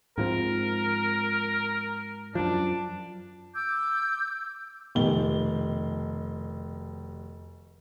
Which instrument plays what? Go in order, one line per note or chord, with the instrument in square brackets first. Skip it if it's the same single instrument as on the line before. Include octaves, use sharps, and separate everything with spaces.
[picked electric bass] G#2 F3 C4 [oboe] A#4
[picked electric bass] F#2 F3 [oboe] D4
[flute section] D6 E6 G6
[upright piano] F1 B2 D#3 G7